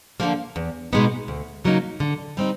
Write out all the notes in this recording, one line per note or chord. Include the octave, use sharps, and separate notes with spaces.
D3 F3 A#3
E2
B2 G#3 B3 D#4
D2
C#3 F#3 A#3 D#4
D3
G3 C4 D#4